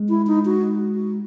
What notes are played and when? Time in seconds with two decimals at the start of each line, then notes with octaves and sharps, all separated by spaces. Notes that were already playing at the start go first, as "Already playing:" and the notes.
Already playing: G#3
0.09 E4
0.27 D#4
0.45 F#4
0.95 F#4